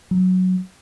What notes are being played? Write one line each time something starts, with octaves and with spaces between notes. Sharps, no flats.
F#3